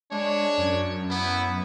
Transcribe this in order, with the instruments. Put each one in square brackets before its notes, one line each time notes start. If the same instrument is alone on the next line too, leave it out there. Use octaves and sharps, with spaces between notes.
[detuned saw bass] G#3 [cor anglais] D4 [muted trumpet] C#5
[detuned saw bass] F#2
[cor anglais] B3 [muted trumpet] E4